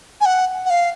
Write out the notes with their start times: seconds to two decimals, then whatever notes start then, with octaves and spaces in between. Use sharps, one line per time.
0.21 G#5
0.26 F#5
0.66 F#5
0.70 F5